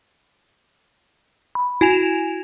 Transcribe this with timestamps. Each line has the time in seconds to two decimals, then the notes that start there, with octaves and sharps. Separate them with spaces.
1.55 B5
1.81 E4 F#4 G#5 E7 F7